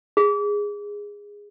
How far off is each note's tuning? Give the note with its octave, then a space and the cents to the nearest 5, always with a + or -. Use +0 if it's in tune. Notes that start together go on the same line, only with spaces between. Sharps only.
G#4 -15